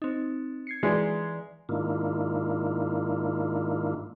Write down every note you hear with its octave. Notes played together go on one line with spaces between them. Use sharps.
C4 D#4
G#6 C7 C#7
E3 G#3 B4 D5
G#2 D#3 A#3 D4 E4 F4